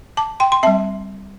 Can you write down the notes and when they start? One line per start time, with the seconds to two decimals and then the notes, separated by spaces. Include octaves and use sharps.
0.17 A5 D6
0.40 G5 C6
0.52 C6
0.63 G3 C4 E5 A5